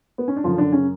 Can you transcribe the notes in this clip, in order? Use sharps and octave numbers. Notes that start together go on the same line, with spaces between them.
B3
C#4
D4
F#2 D3 F3 F4
D3 D4
C#3 C#4